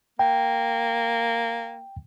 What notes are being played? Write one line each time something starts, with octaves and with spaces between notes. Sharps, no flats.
A#3 G5